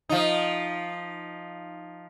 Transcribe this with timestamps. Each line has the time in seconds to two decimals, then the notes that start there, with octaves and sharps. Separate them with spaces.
0.09 F3 D#4